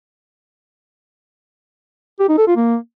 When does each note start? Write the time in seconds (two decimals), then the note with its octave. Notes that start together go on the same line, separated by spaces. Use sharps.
2.20 G4
2.29 D#4
2.38 A4
2.47 F4
2.56 A#3